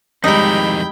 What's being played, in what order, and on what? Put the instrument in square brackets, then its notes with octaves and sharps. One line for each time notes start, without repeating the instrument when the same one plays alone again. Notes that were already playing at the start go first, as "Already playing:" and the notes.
[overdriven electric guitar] F2 D#3 [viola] G3 G#3 [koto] D#4 E4 [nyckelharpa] G5 B5